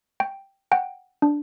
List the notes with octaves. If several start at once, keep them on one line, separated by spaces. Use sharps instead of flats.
G5
F#5 G5
D4